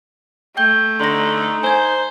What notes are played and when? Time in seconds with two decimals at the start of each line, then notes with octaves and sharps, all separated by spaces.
0.57 A3 G5 G6 G7
1.00 D3 D#4 C6 A#6
1.63 C5 G#5 G#6